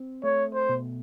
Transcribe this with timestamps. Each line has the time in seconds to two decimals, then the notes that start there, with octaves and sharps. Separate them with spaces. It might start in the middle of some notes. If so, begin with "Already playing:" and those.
Already playing: C4
0.23 A3 C#5
0.54 C5
0.69 B2